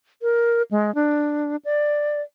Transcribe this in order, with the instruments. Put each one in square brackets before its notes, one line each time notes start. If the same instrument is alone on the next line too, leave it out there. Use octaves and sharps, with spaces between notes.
[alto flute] A#4
G#3
D4
D5